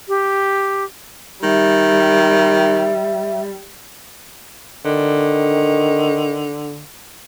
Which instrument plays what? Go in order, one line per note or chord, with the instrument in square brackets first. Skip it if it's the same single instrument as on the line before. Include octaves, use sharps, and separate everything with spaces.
[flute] G4
[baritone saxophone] D#3 [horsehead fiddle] G3 [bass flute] E5
[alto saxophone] D3 [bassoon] D#3